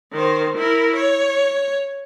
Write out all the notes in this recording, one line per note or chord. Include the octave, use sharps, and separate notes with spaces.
D#3 C5
E4 A#4
C#5